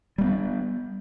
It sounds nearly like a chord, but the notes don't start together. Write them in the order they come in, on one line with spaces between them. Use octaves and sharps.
G3 A#3 B3